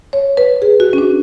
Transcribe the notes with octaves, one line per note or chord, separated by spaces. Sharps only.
C#5
B4
G#4
F#4
C#4
D4